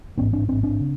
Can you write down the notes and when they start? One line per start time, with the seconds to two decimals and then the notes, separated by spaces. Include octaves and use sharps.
0.17 A1 G#2 B3 C#4
0.33 C4 D4
0.48 A1 G#2 C4 D4
0.63 C4 D4
0.80 C#3